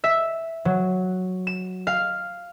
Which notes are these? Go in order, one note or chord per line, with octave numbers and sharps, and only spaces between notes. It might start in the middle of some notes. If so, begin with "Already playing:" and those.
E5
F#3
E7
F5